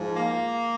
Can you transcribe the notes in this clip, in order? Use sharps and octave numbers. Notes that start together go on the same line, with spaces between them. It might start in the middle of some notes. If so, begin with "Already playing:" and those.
Already playing: G#2 F3
A#3